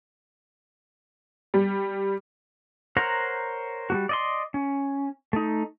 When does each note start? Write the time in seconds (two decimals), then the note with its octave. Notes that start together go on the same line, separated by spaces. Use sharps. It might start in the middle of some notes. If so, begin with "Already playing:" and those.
1.54 G3
2.97 A#4 C5 C#5 F#5 A#5
3.90 G3 A#3 F#4
4.09 D5 D#5 C6
4.54 C#4
5.33 A3 D#4